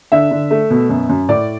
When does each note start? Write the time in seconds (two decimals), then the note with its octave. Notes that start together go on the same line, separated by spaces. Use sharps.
0.12 D3 E5
0.31 D3
0.51 A3
0.70 B2
0.90 F#2
1.09 F#2
1.29 A2 D5